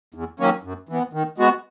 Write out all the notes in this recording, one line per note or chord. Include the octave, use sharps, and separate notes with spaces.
E2
D#3 F#3 A#3 C#4
F#2
E3 B3
D#3
G#3 B3 F#4